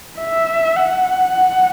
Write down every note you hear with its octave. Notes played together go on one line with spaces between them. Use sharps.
E5
F#5